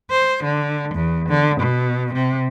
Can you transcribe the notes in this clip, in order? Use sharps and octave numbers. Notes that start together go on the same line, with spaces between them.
C5
D3
E2
D3
B2
C3